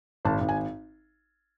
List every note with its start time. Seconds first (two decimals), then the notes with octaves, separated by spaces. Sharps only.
0.25 G#1 A5
0.41 G#1
0.49 G#5